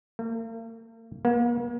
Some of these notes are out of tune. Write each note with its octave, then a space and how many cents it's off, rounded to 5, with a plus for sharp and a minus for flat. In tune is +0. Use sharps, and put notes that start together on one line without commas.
A#3 -45
A#3 +40